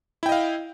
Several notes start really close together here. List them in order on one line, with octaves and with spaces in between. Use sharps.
E4 G5 D#5 F5